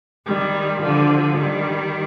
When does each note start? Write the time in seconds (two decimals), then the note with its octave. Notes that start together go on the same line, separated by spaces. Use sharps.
0.26 D#3 G3
0.81 D3 F3
1.37 D#3 G3